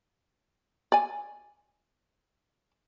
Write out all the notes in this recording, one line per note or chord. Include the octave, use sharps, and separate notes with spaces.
D5 G#5